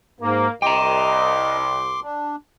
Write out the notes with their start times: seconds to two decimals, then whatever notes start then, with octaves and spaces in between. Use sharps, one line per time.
0.21 G#2 A#3
0.62 C2 D#5 G5 A#5 C6 D6
2.03 D4